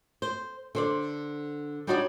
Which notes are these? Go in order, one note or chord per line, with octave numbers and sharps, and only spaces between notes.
C5
D3 C5 D5
G3 D4 D#4 F#4 C#5 D5